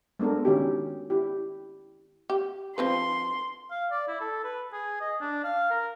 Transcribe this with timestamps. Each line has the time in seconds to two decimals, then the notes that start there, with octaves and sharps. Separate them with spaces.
0.19 G#3 B3 D4 A4 A#4
0.45 D#3 C#4 D#4 F#4 G4
1.10 E4 G4
2.30 G4
2.78 F3 C4 B4 C6
3.71 F5
3.91 D5
4.08 E4
4.21 A4
4.44 B4
4.73 G#4
5.01 D#5
5.21 D4
5.44 F5
5.71 A#4